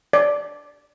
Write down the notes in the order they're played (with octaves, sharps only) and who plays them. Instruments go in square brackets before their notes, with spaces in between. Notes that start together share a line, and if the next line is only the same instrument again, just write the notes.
[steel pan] D5